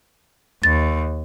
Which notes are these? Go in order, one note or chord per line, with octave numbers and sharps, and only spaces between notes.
D#2 A6